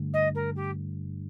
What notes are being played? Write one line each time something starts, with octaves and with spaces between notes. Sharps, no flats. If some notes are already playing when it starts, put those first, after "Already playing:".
Already playing: G2 D3 A3
D#5
A#4
G4